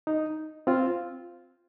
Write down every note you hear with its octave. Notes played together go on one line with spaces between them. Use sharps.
D#4
C4 F4